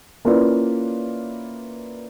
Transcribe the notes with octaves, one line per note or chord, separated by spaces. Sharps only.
A#3 C#4 E4 F4 B4 D5